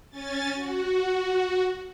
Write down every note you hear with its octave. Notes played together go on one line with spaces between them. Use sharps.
C#4 G#5 A6
F#4